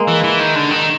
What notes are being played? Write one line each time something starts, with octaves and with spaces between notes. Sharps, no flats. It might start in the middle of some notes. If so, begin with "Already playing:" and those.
Already playing: G#3 A#3
E3
E3
D#3
D3
D#3